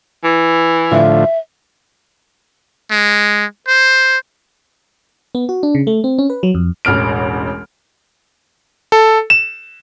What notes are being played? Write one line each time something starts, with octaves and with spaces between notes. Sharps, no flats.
E3
A2 D3 F3 E5
G#3
C5
B3
F#4
D4
C#3
A3
C4
C#4
B4
F#3
F2
E1 A1 F6 D7
A4
E7